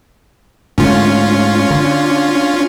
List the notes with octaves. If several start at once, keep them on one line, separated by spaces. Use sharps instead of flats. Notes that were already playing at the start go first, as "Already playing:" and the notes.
G#2 D3 A3 C#4 F4
D3